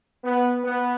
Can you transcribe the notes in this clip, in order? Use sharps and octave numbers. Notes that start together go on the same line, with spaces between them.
B3
B3